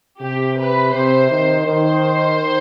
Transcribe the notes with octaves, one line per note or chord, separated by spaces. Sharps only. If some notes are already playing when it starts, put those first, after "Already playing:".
C3 G4
B4
C3 C5
D#3
D#3 C5